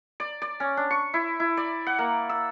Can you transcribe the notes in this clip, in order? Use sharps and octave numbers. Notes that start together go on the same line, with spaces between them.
D5
D5
C#4
D4
C#6
E4
E4
D5
F#5
A#3
E6